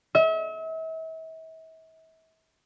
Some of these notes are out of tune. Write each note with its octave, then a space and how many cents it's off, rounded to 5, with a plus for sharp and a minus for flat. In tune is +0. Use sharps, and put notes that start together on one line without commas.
E5 -40